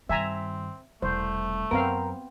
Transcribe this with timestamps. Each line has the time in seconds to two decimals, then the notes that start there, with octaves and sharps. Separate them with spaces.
0.09 G2 D#3 C4 E5 G#5 A#5
1.02 E1 C2 A3 C5
1.71 F#2 B3 C4 A#4 F5